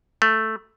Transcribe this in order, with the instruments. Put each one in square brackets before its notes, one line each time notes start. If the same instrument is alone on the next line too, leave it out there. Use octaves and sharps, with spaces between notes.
[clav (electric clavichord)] A3